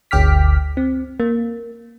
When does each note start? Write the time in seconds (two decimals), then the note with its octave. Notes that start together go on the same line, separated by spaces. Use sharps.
0.11 G1 D2 G5 D6 F6 B6
0.77 C4
1.20 A#3